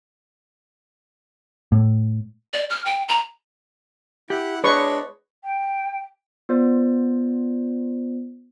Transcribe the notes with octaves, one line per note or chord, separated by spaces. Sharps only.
A2
D5
F6
G5
A#5
E4 G4 F#5 F#6
G#3 D4 B4 C#5 C#6
G5
B3 F4 C5 D5